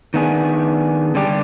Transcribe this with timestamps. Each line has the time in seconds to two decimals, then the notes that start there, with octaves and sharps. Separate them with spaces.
0.14 D#3 B3 D4 G#4
1.15 D3 G3 D4 G4